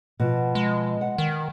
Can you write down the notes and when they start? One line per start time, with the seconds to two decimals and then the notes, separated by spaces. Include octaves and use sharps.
0.20 B2 F3
0.55 G#3
1.01 F#5
1.18 D#3